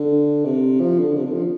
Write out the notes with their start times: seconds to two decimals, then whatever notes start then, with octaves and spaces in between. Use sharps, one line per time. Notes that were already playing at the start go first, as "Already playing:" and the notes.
Already playing: D3
0.45 C3
0.80 F3
0.99 D3
1.17 C3
1.25 D3
1.34 F3